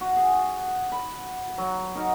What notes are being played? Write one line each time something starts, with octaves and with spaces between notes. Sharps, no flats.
F#4
G#4
B5
F#3
D#4 F#4 A#4